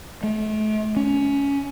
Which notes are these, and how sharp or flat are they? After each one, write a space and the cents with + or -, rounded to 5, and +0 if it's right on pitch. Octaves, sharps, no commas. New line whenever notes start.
A3 -40
C#4 +20